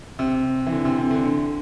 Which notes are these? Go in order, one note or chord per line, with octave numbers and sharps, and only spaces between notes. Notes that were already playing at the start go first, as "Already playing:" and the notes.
C3
E3
D3
C3
C3
D3
D3